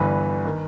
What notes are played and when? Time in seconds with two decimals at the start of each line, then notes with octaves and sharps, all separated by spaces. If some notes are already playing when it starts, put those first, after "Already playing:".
Already playing: G1 G2 E3 B4
0.45 D#3